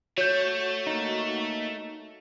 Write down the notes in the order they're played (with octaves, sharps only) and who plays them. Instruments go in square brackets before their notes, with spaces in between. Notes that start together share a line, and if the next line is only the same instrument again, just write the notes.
[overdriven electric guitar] A3 [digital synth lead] F#4 [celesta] C#5 G6
[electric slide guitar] A#3 D#4